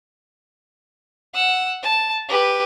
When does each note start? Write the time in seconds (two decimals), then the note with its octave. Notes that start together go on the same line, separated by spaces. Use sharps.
1.34 F#5 E6
1.83 A5
2.29 G4 B4